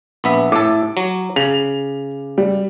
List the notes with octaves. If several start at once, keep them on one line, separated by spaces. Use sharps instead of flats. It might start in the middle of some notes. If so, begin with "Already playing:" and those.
A#1 B3 E5
A2 A4 D6
F#3
C#3 F7
G3